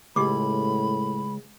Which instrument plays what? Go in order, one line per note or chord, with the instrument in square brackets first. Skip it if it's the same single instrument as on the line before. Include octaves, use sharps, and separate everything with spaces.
[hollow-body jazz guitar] C#2 [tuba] A2 [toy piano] G4 C#6 D6 [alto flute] B5